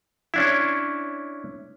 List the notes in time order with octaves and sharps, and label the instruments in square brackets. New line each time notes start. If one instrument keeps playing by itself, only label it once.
[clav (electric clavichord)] C#4 D4 E4